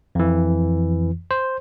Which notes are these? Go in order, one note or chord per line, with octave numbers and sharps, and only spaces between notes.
F2 E3
C5